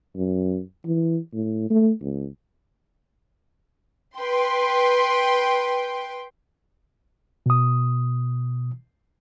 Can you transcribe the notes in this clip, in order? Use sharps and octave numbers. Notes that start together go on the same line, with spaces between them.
F#2
E3
A2
A3
C#2
B4 G5 C6
B2 D#6